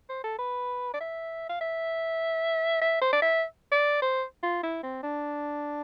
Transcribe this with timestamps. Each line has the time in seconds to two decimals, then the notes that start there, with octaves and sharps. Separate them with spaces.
0.09 C5
0.23 A4
0.38 B4
0.93 D5
1.00 E5
1.49 F5
1.60 E5
2.81 E5
3.01 C5
3.13 D5
3.22 E5
3.72 D5
4.02 C5
4.43 F4
4.63 E4
4.83 C4
5.03 D4